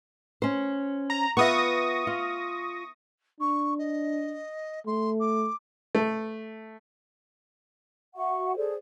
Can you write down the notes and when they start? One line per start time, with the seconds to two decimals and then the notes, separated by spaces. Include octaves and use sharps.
0.42 C#4 C5
1.10 A#5
1.37 B3 F4 E5 C#6 D#6 A#6
2.07 F4
3.40 D4 C#6
3.78 D#5
4.87 A3 C6
5.20 D6
5.95 A3
8.15 F#4 E5 F#5 C#6
8.57 G#4 A4 C5 D5